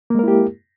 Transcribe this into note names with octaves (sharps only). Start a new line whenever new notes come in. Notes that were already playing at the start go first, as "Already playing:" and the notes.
G#3 A#3 E4 G4 A#4